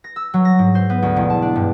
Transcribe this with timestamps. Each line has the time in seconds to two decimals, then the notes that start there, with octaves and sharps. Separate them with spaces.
0.04 A#6
0.16 E6
0.34 F#3
0.45 A#6
0.59 G#2
0.75 C5
0.90 B3
1.02 D2
1.17 E1
1.30 A5
1.42 D4
1.56 G2